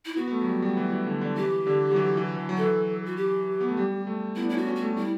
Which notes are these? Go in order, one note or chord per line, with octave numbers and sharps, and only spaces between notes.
E4
B3 F#4
B3
A3
F#3
G3
G3
E3
E3
D3
D3
E3 G4
D3
F#3
E3
E3
E3
F#3
E3 A4
F#4
G4
B3
A3
G3
A3
B3 E4
D4
C#4 E4
F#4
C#4
F#4
A3
G3 E4